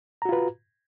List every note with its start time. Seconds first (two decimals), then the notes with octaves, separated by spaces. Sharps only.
0.22 A#5
0.25 F#4
0.29 F4
0.32 B4